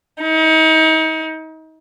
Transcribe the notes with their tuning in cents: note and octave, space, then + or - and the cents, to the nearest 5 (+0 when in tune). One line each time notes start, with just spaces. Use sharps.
D#4 +35